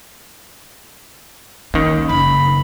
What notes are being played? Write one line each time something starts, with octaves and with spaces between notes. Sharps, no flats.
D#2 D#3 C#4
F#1 B5